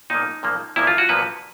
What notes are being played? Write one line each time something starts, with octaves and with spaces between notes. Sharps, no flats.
A#2 F3 A#3 D#4
A#2 F3 A#3
A#2 F3 A#3 E4
F4
F#4
A#2 F3 A#3 B4